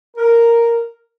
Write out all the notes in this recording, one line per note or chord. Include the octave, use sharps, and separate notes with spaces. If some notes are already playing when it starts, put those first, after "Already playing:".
A#4